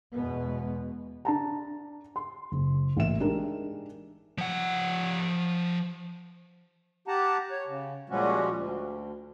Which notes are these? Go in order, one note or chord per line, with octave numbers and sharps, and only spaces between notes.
E2 B2 G#3 B3
D4 A5 A#5
C6
F#1
A1 A#3 E5 E7
G#3 D4 D#4 G4 G#4 A#4
F3 F#5
G4 F#5 A5 A#5
C#5
C#3
A#2 F3 G3 G#3 C#4 F#4
D2